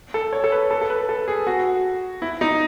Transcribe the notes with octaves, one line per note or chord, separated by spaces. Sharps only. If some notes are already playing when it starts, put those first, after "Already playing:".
A4
C#5
A4
B4
A4
A4
B4
A4
G#4
F#4
E4
D#4